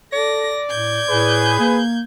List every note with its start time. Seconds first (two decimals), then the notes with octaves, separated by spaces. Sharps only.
0.13 A4 D5 A#6
0.70 A2 G6 G#6
1.09 A2 G#4 B4
1.59 A#3